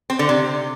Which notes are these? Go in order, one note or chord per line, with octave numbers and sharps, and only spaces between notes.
C4
D3
C3